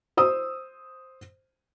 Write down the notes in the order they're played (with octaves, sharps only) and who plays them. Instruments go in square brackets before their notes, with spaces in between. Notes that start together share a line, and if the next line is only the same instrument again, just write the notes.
[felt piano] C5 D#6 E6